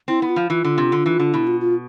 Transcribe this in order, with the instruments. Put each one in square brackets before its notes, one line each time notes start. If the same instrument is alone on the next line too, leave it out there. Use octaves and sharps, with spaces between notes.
[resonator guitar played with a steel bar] C4 [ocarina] E4
[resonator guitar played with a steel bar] B3
[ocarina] F4
[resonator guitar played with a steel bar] F3
[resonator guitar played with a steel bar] E3 [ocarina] F4
[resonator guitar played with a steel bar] D3
C3
D3
E3
D3
[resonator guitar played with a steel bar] B2 [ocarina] E4
[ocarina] F4
F4